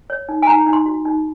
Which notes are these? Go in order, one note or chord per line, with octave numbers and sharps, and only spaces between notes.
C#5
D#4
G#5
D#4 A#5
D#4
C6
F#4
D#4